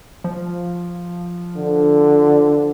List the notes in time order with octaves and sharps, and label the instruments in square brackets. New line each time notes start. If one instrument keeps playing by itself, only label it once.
[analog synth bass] F3
[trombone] D3